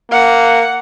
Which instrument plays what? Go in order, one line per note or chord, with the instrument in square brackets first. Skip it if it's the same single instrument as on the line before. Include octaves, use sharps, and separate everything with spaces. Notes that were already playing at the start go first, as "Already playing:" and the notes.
[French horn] A#3 [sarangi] F#5